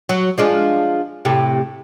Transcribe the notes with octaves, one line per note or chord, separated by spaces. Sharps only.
F#3
F3 G#3 D4
A2 C3 G4